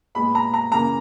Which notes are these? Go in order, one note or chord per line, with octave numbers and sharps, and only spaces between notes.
A#2 G#3 B3 B5
A#5
A#5
C#3 E3 A#3 A#5